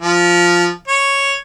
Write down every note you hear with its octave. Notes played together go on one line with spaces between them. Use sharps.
F3
C#5